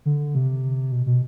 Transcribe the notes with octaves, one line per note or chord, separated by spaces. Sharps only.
D3
C3
B2
B2